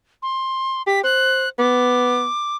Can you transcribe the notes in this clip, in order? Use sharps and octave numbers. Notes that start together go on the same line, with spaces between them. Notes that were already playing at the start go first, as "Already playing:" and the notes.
C6
G4 B6
C5 F#6
B3 D6